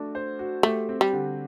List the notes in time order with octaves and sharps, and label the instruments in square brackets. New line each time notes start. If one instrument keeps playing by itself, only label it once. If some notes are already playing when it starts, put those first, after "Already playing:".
Already playing: [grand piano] A3 D4 F#4
C5
F#4
[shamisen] A3 [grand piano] G4
[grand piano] C4
[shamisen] G3
[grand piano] D3